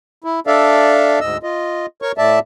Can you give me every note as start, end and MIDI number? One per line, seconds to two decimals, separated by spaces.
0.24 0.40 64
0.47 1.19 62
0.47 1.19 69
0.47 1.19 74
0.47 1.19 76
0.47 1.19 77
1.20 1.37 38
1.20 1.37 44
1.20 1.37 75
1.20 1.37 88
1.43 1.86 65
1.43 1.86 75
2.02 2.12 70
2.02 2.12 73
2.02 2.12 85
2.18 2.39 45
2.18 2.39 57
2.18 2.39 74
2.18 2.39 76
2.18 2.39 81